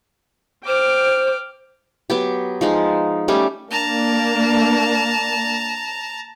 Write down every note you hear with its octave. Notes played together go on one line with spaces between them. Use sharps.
C5 G5 D6 F6
F#3 B3 G4
F3 G#3 D#4
G3 A3 C#4 G4
A#3 D4 A5 A#5